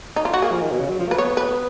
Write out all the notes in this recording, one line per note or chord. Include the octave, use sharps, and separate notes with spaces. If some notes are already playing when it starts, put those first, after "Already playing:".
D#4
F4
F#4
A#3 G#4
F3
D#3
B2
C#3
F#3
F3
A#3 B4
B3 C#5
B4